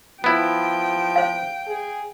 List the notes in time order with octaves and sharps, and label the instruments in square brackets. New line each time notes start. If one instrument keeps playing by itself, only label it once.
[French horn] F3 [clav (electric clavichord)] B3 E4 [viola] G5
[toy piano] C5 F5
[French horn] G#4